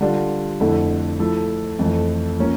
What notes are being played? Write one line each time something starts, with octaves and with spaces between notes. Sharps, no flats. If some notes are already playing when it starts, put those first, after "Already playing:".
D3 G3 D4 F4
F2 D3 A3 E4
F3 A3 E4 A4
F2 E3 A3
F3 A#3 C#4